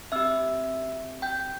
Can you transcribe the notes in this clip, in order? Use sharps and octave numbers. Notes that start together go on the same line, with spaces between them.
C4 G4 E5 E6
G5 G6